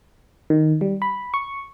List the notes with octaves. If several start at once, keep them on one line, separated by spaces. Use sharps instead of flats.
D#3
G3
B5
C#6